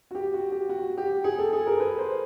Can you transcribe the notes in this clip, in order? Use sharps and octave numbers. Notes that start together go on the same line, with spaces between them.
F#4
G4
F#4
G4
F#4
G4
G#4
A4
G#4
A#4
B4
C5